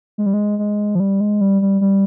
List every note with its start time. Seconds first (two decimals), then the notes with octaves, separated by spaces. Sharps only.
0.18 G#3
0.26 G3
0.34 G#3
0.59 G#3
0.95 F3
1.00 G3
1.20 G#3
1.41 G3
1.62 G3
1.81 G3